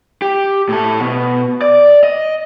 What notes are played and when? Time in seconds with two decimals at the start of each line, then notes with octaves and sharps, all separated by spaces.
0.22 G4
0.68 A2 A4
1.01 B2
1.61 D5
2.03 D#5